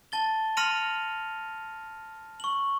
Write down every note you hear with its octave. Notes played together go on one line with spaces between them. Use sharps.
A5 A6 G7
C6 F6 A#6 C#7 D#7 F7
C#6 F#7